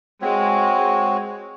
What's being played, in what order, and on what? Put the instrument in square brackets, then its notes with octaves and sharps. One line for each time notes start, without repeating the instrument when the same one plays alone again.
[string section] G#3 [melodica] C4 F#4 C#5